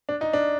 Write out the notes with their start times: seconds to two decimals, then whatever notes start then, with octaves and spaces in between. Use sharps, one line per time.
0.09 D4
0.21 D#4
0.33 D4